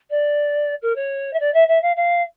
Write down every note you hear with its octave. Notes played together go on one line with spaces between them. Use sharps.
D5
A#4
C#5
E5
D5
E5
E5
F5
F5